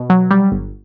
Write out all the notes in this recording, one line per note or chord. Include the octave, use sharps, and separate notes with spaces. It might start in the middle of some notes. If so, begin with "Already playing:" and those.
Already playing: B2
F#3
G3
G1